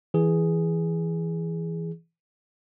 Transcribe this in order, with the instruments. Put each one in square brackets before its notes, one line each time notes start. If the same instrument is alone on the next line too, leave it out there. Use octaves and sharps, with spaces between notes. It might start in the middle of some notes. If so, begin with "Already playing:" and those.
[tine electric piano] E3 G#4